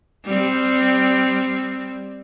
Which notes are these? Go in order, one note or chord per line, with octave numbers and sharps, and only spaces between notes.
G3 C4